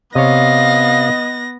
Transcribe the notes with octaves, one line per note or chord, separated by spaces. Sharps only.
C3 B3 C#5 D#5 F5 A#6